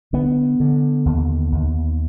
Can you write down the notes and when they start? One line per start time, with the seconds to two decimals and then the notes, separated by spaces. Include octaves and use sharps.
0.13 D3 B3
0.60 D3
1.06 D#2
1.52 D#2